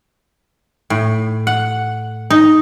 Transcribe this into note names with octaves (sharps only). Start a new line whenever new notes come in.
A2
F#5
D#4